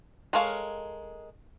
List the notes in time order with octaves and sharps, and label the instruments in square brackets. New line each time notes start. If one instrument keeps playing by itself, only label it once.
[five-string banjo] G#3 A4 A#4 C#5 F5